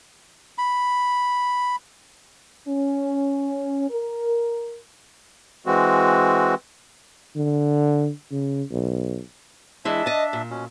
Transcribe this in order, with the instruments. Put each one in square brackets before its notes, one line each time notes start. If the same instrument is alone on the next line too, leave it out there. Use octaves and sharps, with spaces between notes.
[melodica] B5
[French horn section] C#4
A#4
[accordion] E3 G#3 C4 F#4
[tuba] D3
C#3
B1
[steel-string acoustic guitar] E3 G#3 E4 [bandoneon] D4 E5
[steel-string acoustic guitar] D#5 A5
A#2
[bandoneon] B2 C#4